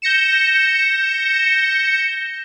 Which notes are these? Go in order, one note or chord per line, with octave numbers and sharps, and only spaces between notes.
G6 A#6 C#7 E7